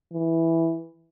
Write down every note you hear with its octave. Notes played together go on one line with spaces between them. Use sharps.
E3